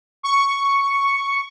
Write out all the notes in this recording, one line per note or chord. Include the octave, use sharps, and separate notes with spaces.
C#6